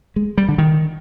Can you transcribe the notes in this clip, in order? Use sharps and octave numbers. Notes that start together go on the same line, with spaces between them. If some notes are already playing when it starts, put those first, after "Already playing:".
G#3
G3
D3
D#3